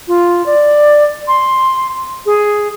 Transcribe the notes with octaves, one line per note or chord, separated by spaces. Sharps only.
F4
D5
C6
G#4